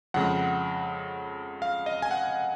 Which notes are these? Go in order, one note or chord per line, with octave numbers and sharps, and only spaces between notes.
F2 C#3 G#3 F#5
F5
D#5
G#5
F#5